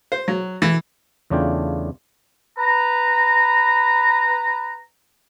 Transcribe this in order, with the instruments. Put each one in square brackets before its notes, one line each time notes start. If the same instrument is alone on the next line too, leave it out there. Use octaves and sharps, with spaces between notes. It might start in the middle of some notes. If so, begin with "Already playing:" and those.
[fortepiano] C5
F#3
E3
[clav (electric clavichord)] E2 C#3 A3 D4 F4 G5
[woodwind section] B4 A#5